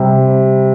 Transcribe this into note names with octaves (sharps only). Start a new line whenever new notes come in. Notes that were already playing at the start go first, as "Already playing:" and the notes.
Already playing: C3 G3